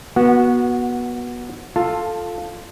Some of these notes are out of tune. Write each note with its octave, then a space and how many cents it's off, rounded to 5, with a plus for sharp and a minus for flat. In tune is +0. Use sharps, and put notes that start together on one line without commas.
B3 -30 F#4 -5
F4 +5 A4 +0 A5 +20